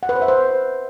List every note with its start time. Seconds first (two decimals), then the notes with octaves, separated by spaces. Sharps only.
0.03 F#5
0.09 B4
0.16 C5
0.22 E5
0.28 C5